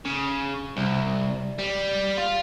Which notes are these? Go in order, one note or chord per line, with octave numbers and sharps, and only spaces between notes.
C#3
C2
G3
F4